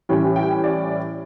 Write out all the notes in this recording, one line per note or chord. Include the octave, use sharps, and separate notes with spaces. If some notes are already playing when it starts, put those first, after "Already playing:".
A2 E3 G3 C#4 G5
G5
D5